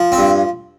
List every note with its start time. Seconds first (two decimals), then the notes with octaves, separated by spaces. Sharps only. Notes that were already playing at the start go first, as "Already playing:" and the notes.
Already playing: F3
0.12 C4
0.18 G2